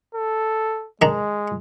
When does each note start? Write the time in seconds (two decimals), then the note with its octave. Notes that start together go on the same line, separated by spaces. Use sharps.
0.15 A4
1.02 D#3 G#3 D4 A#5